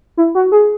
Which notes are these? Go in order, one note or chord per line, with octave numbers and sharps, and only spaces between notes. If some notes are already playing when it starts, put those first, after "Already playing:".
E4
F#4
G#4